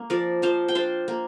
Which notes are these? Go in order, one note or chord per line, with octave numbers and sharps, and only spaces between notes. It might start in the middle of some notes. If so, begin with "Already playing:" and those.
Already playing: A#3
F3 A#4 D5
F3 C5 F5
G5
D4 C5 F5
A#3